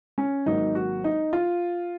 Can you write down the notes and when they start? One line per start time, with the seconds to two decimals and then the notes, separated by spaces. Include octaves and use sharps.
0.18 C#4
0.46 G#1 G#2 F#3 A#3 D#4
0.75 F#4
1.04 D#4
1.33 F4